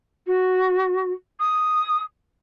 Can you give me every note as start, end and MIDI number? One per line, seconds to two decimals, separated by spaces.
0.27 1.12 66
1.40 2.01 87